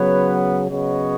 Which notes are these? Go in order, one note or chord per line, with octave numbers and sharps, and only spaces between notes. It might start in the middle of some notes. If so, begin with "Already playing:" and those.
Already playing: C#3 F#3 B3 B4 C#5
C#3 F#3 B3 C#5 D#5